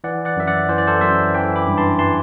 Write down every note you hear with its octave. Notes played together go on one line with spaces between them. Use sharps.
E3 D5 F#5
D5 F#5
F#2 E5
D5 F#5
E3 C5
D5
A4 C5
F#2 C5 E5
E3 E5 G5
B5 D6
G2
A5 C6
E3 A5 C6